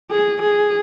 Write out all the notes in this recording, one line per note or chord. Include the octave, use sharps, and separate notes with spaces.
G#4
G#4